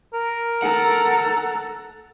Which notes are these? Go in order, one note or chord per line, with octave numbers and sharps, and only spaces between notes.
A#4
A4 F#5 A#5